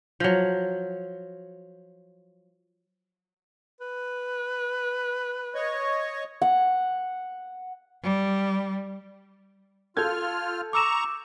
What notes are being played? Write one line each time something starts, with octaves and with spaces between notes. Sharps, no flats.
F3 F#3
B4
C#5 D#5 C#6
F#5
G3
F4 A4 F6 G6 G#6
A#5 C#6 D6 E6 E7